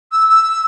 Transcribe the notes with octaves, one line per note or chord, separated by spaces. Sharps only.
E6
E6